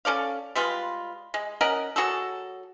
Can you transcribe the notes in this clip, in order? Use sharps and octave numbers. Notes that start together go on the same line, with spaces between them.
C#4 A4 D5 F5
G3 G#3 F4 B4
G#3
C#4 A#4 D#5 F#5
F#3 F#4 G#4 A4